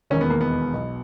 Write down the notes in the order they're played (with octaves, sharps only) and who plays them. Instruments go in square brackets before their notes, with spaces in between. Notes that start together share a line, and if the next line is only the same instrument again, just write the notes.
[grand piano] E1 D#2 D#3 C#4
B3
A#3
B3
B1 B2